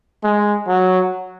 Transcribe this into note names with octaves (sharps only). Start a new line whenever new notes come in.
G#3
F#3